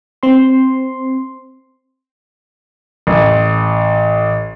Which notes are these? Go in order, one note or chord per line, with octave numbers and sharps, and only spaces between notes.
C4 C6
A1